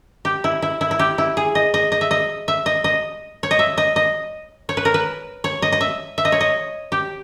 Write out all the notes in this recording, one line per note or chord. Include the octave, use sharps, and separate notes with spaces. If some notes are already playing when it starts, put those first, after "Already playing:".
G4
E4
E4
E4
E4
G4
E4
G#4
D#5
D#5
D#5
E5
D#5
E5
D#5
D#5
C#5
D#5
E5
D#5
D#5
C#5
B4
A#4
B4
C#5
D#5
D#5
E5
E5
D#5
C#5
D#5
G4